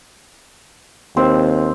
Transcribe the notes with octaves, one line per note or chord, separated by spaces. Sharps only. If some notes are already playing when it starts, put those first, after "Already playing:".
D#2 C4